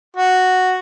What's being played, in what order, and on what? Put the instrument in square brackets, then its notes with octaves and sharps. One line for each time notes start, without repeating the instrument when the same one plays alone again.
[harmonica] F#4